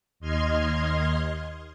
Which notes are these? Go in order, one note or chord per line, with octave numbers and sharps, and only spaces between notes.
D#2 D#5 C6 F6 G#6